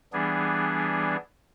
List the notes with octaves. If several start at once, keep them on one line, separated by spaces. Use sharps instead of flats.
E3 G3 B3 D4 G#4